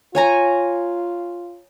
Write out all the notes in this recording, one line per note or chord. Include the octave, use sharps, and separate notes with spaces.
F4 C#5 G#5 A#5